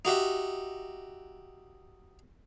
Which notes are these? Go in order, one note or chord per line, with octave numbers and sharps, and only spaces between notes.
D#4 F#4 G4 E5